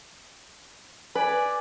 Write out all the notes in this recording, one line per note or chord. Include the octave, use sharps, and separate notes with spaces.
B4 D5 G#5